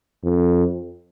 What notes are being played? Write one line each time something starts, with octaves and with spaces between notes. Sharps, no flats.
F2